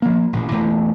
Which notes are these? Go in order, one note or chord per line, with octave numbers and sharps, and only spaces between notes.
F3 A#3
A1 A#2
E1 E3 A3